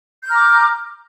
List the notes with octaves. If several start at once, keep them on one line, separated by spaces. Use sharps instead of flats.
A#5 D6 F6 G6